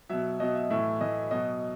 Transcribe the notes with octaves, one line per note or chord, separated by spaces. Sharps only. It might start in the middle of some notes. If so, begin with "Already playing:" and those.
B2 F#3 E5
B2 F#3 D#5
E5
A2 E3 E5
A2 E3 D#5
B2 F#3 D#5